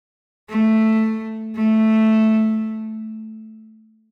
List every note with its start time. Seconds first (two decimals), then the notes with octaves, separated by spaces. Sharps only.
0.49 A3
1.56 A3